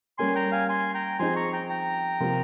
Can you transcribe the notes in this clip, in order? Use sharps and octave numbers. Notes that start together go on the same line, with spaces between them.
G3 A#3 C#4 G#5 C6
G5 A#5
F5 G#5
G#5 C6
G5 A#5
F3 C4 D#4 G#4 G#5 C6
A#5 C#6
G5 A#5
G5 A#5
C3 F3 A#3 F4